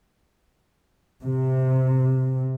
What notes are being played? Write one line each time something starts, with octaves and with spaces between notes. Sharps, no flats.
C3